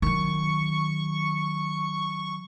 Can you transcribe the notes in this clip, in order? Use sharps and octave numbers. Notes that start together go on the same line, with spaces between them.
D#3 F#3 C#6